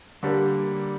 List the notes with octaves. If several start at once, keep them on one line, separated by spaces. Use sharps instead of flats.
D3 G3 A#3